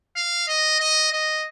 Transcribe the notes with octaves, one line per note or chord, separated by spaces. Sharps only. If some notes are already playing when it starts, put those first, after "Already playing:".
F5
D#5
D#5
D#5